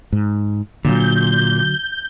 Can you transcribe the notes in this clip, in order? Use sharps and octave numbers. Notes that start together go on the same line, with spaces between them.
G#2
A#2 D3 F#3 G6